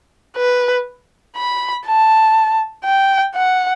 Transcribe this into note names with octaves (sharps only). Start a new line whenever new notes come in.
B4
B5
A5
G5
F#5